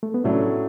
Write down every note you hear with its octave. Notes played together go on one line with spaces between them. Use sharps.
A3
B3
A2 F#3 A3 C#4 D4